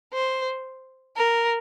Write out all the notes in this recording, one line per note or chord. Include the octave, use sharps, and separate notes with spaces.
C5
A#4